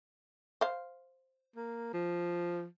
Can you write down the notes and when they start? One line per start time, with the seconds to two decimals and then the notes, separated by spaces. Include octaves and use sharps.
0.61 C5 F5
1.56 A#3
1.94 F3